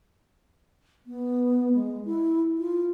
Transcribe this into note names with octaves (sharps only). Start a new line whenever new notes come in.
B3
G#3
E4
F4